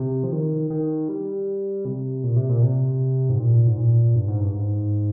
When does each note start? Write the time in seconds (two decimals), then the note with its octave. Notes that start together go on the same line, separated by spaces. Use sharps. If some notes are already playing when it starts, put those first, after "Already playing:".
Already playing: C3
0.24 F3
0.32 D#3
0.70 D#3
1.09 G3
1.85 C3
2.24 A#2
2.36 C3
2.49 A#2
2.62 C3
3.30 G#2
3.39 A#2
3.67 G#2
3.77 A#2
4.16 G2
4.28 G#2
4.40 G2
4.54 G#2